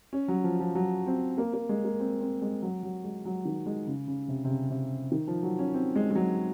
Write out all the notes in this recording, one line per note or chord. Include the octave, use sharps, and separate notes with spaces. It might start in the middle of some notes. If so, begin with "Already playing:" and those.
C#4
F#3
F3
F3
F#3
C4
A#3
A#3
G#3
A#3
C4
C4
G#3
F#3
F#3
G#3
F#3
D#3
G#3
C#3
C#3
C3
C3
C#3
C3
D#3
F3
F#3
C#4
C4
G#3
G#3
F#3